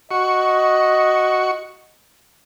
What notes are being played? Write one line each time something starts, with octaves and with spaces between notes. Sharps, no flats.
F#4 D#5 C#6